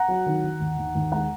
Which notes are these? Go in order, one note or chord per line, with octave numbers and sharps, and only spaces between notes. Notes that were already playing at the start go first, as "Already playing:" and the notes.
Already playing: F#5 A#5
F#3
D#3
D#3
D#2
D#2
D#2
G#3 F#5 A#5